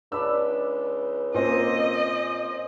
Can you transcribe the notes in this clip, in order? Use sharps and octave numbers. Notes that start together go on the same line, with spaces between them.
C#2 D4 B5 E6
A#2 A#3 C4 C#4 D#5